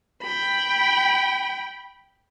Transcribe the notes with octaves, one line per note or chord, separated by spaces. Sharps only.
G5 B5